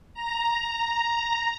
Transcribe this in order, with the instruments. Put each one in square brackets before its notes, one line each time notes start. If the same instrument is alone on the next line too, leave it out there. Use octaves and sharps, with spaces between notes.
[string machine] A#5